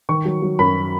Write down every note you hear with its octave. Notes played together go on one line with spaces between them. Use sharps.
D#3 C#6
F#3
F#3
F#2 B5